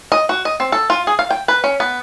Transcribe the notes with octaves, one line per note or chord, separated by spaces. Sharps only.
D#5
F#4
D#5
C4
A4
F4
G#4
F5
G5
B4
C#4
B3